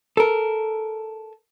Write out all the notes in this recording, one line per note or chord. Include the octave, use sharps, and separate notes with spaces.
A4 A#4